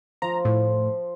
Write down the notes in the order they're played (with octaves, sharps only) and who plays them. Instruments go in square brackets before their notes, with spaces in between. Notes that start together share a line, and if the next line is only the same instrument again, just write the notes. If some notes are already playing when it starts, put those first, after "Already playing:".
[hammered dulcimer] F3 [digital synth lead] A#5
[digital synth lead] A2